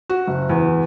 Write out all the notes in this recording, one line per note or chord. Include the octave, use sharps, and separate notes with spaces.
F#4
F#1
E2